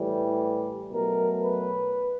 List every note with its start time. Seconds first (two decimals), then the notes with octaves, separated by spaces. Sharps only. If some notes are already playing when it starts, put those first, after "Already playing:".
Already playing: A2 E3 G3
0.91 B2 F#3 A3 A#4
1.42 B4